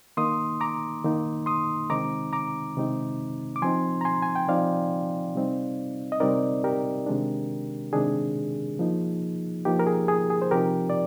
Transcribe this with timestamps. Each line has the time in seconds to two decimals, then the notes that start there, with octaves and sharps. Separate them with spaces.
0.17 D#3 A#3 D#4 C6 D#6
0.61 A#5 D6
1.04 D#3 A#3 D#4
1.46 C6 D#6
1.90 C3 D#3 G#3 C4 D#4 A#5 D6
2.33 A#5 D6
2.77 C3 D#3 G#3 C4 D#4
3.56 D6
3.62 F3 C4 D#4 G#5 C6
4.01 A#5
4.05 G#5 C6
4.22 G#5
4.35 G5
4.48 F3 C4 D#4 D5 F5
5.35 C3 G3 C4 D#4
6.12 D#5
6.20 C3 G3 C4 D#4 A#4 D5
6.64 G4 A#4
7.06 C3 D#3 G#3 D4
7.93 C3 D#3 G#3 D4 G#4
8.79 F3 A#3 D#4
9.65 F3 A#3 D#4 G4
9.79 A#4
9.87 G#4
10.08 G#4
10.30 G#4
10.42 C5
10.51 C3 F3 C4 D#4 G4 A#4
10.90 D5